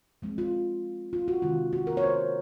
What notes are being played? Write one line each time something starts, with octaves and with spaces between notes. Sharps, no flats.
F3 G#3 C4
F4
F4
F#4
C3 D#3 G#3 C4 F4
F#4
A#4
C#5
C5